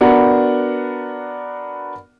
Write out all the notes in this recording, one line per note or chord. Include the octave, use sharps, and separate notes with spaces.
B3 D4 F#4 A#4 F#5